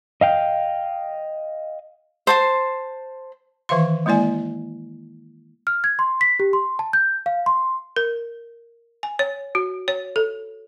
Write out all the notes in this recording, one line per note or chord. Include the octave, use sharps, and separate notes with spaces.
D#5 F5 G5
C5 A5 C6
D#3 E3 E5 F5 C6
G#3 A#3 E4 D5 G#5
F6
G#6
C6
B6
G4
C6
A5
G6
F5
C6
A#4
G#5
C#5
F#4
C#5
A4